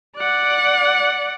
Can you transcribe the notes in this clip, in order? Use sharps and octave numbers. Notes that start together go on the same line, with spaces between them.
D5 F#5